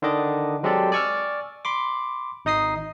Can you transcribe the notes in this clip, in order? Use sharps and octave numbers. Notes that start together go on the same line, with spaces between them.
D3 D#3 D4 D#5 D6
F#3 G#3 C4 G4 A4 D5
D5 G#5 C#6 E6 F6
B5 C6 D6
G#1 D#4 D#5 D#6 C7